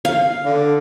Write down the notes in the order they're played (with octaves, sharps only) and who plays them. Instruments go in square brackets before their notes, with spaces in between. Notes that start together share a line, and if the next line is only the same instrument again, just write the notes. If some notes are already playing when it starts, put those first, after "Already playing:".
[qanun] F5
[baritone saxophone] D3